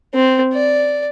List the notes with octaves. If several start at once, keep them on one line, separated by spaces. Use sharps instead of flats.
C4
D5